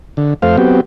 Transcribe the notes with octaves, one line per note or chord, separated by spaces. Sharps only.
D3
F2 A3 C5 F5
F#3 B3 C4 G4